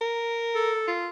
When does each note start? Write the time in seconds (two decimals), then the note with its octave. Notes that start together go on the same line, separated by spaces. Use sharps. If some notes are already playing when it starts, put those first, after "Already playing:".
0.01 A#4
0.55 A4
0.88 F4